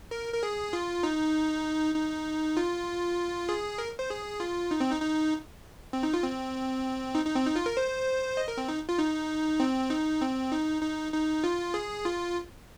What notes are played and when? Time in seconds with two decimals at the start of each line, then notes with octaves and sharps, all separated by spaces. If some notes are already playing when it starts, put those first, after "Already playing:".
0.11 A#4
0.34 A#4
0.43 G#4
0.73 F4
1.03 D#4
1.95 D#4
2.57 F4
3.49 G#4
3.78 A#4
3.99 C5
4.10 G#4
4.40 F4
4.71 D#4
4.80 C4
4.91 D#4
5.02 D#4
5.93 C4
6.03 D#4
6.14 F4
6.23 C4
7.15 D#4
7.25 D#4
7.36 C4
7.46 D#4
7.56 F4
7.66 A#4
7.77 C5
8.37 D#5
8.48 A#4
8.57 C4
8.68 D#4
8.89 F4
8.99 D#4
9.60 C4
9.90 D#4
10.21 C4
10.52 D#4
10.82 D#4
11.13 D#4
11.44 F4
11.74 G#4
12.05 F4